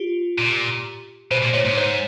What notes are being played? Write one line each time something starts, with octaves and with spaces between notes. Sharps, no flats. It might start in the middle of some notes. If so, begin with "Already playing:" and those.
Already playing: F4 G4
A#2
B2 C5
A#2
A#2 C#5
G#2
C5